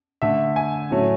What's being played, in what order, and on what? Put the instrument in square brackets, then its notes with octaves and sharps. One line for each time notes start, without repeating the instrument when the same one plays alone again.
[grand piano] D3 A3 E5
G#5
A2 F#3 A3